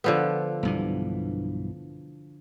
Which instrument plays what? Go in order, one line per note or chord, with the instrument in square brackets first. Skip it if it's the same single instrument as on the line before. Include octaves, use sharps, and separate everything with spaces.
[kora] D3 F3 B3
[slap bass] B1 G2 E3